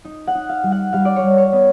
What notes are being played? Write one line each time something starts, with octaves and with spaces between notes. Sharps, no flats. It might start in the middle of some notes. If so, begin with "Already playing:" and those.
D#4
F#5
D#4
F5
G3
F#5
G3 F5
D5
C#5
G3
C#5
B3